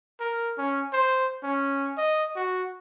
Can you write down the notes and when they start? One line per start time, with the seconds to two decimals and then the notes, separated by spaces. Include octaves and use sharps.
0.20 A#4
0.58 C#4
0.93 C5
1.43 C#4
1.98 D#5
2.36 F#4